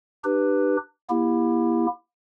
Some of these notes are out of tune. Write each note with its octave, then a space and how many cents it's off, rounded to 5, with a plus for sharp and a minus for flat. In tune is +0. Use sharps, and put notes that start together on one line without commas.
D4 +40 G4 +0 B4 +0
A#3 +40 E4 +5 G4 +25